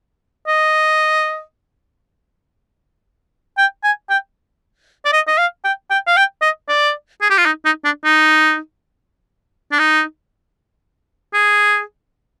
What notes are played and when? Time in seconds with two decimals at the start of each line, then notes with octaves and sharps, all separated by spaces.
0.47 D#5
3.58 G5
3.83 G#5
4.09 G5
5.05 D5
5.13 D#5
5.27 D#5
5.38 F5
5.64 G5
5.90 G5
6.07 F5
6.16 G5
6.42 D#5
6.68 D5
7.21 G#4
7.30 G4
7.38 F4
7.45 D#4
7.65 D#4
7.84 D4
8.04 D#4
9.72 D4
9.79 D#4
11.34 G#4